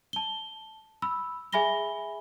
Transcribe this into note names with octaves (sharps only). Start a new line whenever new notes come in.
A5 G7
B5 E6
G#4 E5 G#5 B5 A#6 G7